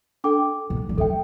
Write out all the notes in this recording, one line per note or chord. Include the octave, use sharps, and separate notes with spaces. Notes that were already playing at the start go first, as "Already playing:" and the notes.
D4 A4 G5 D6
B2
G3
D3 A4 E5 G5